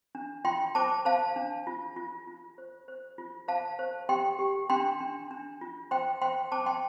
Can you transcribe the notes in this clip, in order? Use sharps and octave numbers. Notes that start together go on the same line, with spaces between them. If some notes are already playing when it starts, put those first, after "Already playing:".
D4
F4 G5 C6
C5 A5 D6
C5 F5 A5
D4
F4
F4
F4
C5
C5
F4
C5 F5 A5
C5
G4 G5 C6
G4
D4 G5 C6
D4
D4
F4
C5 G5 C6
C5 G5 C6
C5 A5 D6
G5 C6